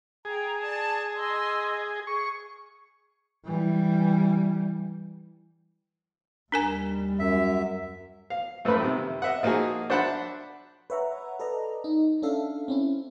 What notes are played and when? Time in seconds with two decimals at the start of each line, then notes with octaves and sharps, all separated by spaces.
0.25 G#4 G5 A#5
0.60 D5 A5
1.16 D#5 C6 E6
2.07 G#4 C#6
3.45 E3 G3
6.52 D#2 G3 D4 A#4 G#5
7.19 F#2 E5
8.30 F5
8.65 F#2 F3 A3 B4 B5
8.80 C3 D#3
9.22 D#5 E5 F#5
9.43 F3 A#3 D#4 F#4 G#4
9.90 D4 C5 E5 F#5 A5 B5
10.90 B4 C#5 E5 F#5 A#5
11.40 A4 B4 D5 D#5 A#5
11.84 D#4
12.22 C#4 D4 A4 E5 F5
12.68 C4 C#4 E4